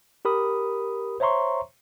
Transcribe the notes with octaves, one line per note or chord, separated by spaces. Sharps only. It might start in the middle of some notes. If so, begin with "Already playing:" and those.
G4 A#4 B5 D#6
C5 C#5 E5 A#5 C6 C#6